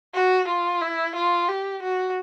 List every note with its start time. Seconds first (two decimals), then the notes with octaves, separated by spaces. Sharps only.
0.14 F#4
0.48 F4
0.82 E4
1.16 F4
1.48 G4
1.82 F#4